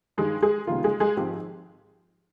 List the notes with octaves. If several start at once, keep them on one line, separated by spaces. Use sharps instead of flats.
G2 D#3 G3 G#3 G#4
G#3 G#4
C#2 C3 D#3 G3 A#3 F4
G#3 G#4
G#3 G#4
G#1 G#2 F3 C4 G4